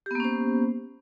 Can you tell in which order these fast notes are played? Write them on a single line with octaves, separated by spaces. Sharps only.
G4 B3 A#3 C#4 C5